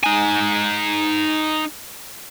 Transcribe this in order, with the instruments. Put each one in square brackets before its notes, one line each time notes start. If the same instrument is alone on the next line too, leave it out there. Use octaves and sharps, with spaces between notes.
[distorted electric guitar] D#4 G#5